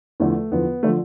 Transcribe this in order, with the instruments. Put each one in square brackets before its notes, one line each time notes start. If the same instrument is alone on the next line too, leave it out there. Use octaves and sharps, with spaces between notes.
[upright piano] E2 D3 F3 A3
E2 D3 F3 B3
D3 F3 A3